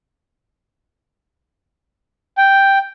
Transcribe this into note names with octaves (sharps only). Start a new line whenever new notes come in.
G5